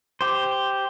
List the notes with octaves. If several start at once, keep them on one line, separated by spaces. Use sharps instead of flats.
G4 C5